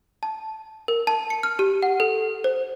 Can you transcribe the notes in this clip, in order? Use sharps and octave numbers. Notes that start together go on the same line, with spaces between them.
A5
A#4
A5
C#7
F6
G4
F#5
A4
C5